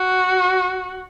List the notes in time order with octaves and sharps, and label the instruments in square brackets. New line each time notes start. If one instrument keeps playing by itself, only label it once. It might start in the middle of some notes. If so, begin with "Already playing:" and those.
Already playing: [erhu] F#4